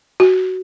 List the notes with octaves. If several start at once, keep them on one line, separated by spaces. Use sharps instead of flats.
F#4